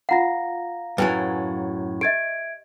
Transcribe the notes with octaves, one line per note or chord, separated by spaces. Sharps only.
F4 F5 F#5 A#5 A#6
F#2 A2 F#3 B4 G5 G#5
G4 D#5 E5 G#6 D7